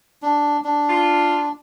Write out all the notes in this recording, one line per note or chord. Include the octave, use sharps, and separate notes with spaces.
D4
D4
F4